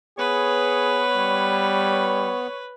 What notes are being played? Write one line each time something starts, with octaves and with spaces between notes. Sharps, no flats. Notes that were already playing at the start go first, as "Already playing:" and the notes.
B3 G#4 B4 C#5
G3